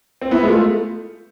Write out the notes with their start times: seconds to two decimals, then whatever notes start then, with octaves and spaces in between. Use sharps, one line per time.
0.21 C4
0.31 B3 E4
0.43 G#3
0.48 A3 F4